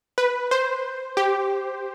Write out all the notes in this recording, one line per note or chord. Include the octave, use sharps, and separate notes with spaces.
B4
C5
G4